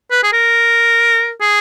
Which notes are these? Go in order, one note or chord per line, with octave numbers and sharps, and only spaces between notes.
B4
G#4
A#4
G#4